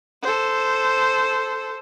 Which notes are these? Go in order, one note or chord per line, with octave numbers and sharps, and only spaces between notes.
A4 C5